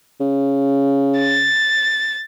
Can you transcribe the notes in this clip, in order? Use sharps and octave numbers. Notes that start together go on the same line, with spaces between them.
C#3
A6